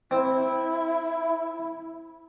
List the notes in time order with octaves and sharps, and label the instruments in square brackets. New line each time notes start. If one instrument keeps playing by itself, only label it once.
[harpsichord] C4 [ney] E4